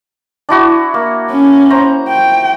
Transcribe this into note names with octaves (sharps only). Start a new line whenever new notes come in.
D4 E4 F#4
A#3
C#4
C5 A#5 C#6
G5